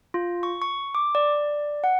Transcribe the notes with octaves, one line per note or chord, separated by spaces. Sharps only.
F4
C#6
C#6
D6
D5
F#5